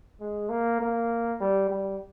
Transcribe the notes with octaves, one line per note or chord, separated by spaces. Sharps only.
G#3
A#3
A#3
G3
G3